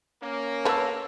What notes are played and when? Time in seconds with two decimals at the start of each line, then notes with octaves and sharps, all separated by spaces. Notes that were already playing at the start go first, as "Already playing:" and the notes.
0.23 A#3 C#4
0.65 B4 C#5 A5 E6